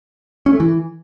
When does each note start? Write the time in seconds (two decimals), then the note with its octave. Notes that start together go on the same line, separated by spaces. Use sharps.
0.46 C#4
0.53 A3
0.60 E3